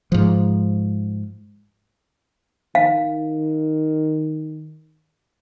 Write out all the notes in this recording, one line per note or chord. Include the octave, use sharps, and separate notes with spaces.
G#2 F3
D#3 F5